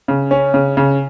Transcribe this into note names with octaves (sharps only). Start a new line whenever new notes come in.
C#3
C#4
C#3
C#3